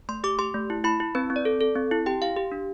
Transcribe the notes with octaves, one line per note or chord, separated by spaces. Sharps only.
A3 C6
G4 D6
G4 C6
A3
E4
E4 B5
E4
C4 B4
C4
D5
A4
A4
C4
E4
G4 G5
G4 F5
G4
D4